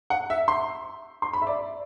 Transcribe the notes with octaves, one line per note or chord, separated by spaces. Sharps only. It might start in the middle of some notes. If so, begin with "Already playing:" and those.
F#5
E5
C6
C6
B5
E5
D5